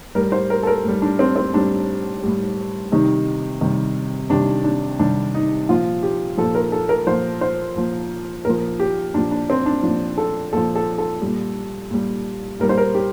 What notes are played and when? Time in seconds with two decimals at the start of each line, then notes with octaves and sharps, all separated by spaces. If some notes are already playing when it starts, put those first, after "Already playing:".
0.15 A2 G3 A#4
0.32 C5
0.50 A#4
0.63 A4
0.67 A#4
0.84 A2 G3
1.02 D4
1.19 C4
1.36 C4
1.54 A2 G3 D4
2.23 A2 G3
2.92 C3 D#3 G3 D#4
3.61 C3 D#3 G3
4.30 C3 D#3 G3 D4
4.64 D4
4.99 C3 D#3 G3 D4
5.34 D#4
5.69 A#2 F3 F4
6.03 G4
6.37 A#2 F3 A4
6.55 A#4
6.72 A4
6.89 A#4
7.07 A#2 F3 C5
7.41 C5
7.76 A#2 F3
8.45 A#2 F3 A#4
8.80 G4
9.14 A#2 F3 D4
9.31 D4
9.50 C4
9.66 D4
9.83 A#2 F3 D4
10.18 A4
10.53 A#2 F3 A4
10.76 A4
10.98 A4
11.22 A#2 G3
11.91 A#2 G3
12.60 A#2 G3 A#4
12.69 C5
12.78 A#4
12.95 G4